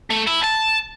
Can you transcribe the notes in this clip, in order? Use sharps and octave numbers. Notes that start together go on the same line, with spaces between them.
A3
E4
A5